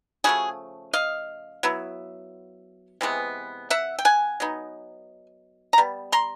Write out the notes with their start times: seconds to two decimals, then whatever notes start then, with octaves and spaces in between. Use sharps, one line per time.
0.24 C#3 F3 A3 F#4 G#4
0.93 D#5 F5
1.63 F#3 B3 E4
3.01 C3 E3 G#3 B3
3.70 E5 F#5
3.99 G5
4.05 F#5 G#5
4.40 F#3 B3 D#4
5.73 A#5
5.78 G3 B3
6.12 A#5 C6